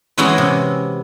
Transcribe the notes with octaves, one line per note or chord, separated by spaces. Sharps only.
E3 G#3 C#4 E4 F#4 G#4
C3